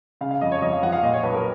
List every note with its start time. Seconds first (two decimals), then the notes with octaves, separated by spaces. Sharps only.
0.21 C#3 F5
0.31 F5
0.41 F2 D#5
0.52 C#5
0.61 F2 D#5
0.73 F5
0.83 F3 F#5
0.92 F5
1.03 A#2 D#5
1.14 C#5
1.23 B1 B4
1.34 A#4